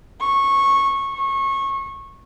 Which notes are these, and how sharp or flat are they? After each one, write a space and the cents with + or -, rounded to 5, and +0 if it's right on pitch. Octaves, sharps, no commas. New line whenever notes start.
C#6 -15
C#6 -25